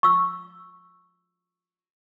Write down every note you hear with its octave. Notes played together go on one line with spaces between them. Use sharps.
C#6 E6